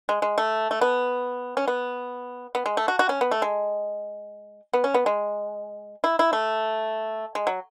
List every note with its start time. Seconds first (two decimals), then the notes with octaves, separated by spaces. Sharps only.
0.09 G#3
0.22 G#3
0.38 A3
0.71 A3
0.81 B3
1.57 C#4
1.68 B3
2.55 B3
2.66 G#3
2.77 A3
2.88 F#4
2.99 F#4
3.09 C#4
3.21 B3
3.31 A3
3.42 G#3
4.73 B3
4.84 C#4
4.94 B3
5.06 G#3
6.04 E4
6.19 E4
6.33 A3
7.35 G#3
7.47 F#3